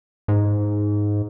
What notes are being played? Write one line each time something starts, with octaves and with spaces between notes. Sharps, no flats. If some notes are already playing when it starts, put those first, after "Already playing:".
G#2